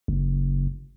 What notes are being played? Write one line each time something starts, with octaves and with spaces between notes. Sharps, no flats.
F#1